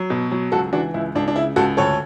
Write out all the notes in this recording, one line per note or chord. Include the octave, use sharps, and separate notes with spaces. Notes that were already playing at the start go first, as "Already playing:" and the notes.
Already playing: F#3
B2
F#3
C#2 F#4 A4
E3 D4 F#4
C#2 E4
C#2 D4
D4
C#3 E4
C#2 F#4 A4
D2 A4 C#5